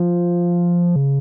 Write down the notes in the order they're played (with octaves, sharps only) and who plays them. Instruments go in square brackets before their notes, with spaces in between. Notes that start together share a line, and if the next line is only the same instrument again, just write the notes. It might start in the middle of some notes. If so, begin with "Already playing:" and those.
Already playing: [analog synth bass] F3
C#3